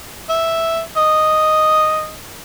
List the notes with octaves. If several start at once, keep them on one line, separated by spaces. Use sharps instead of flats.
E5
D#5